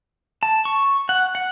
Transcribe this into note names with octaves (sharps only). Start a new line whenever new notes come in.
A5
C#6
F#5
F#5